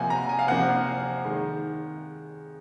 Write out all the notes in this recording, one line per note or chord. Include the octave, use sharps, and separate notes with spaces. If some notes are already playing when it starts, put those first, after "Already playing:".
Already playing: C3 F3 A#3 F#5 G#5
A#5
G#5
F5
C3 F3 A#3 F#5
D#3 G#3